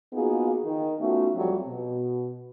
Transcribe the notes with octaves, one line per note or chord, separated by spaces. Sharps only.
A#3 B3 D#4 F4 F#4 G#4
D#3
A3 B3 C#4 D#4 F4 F#4
F2 F#3 G3
B2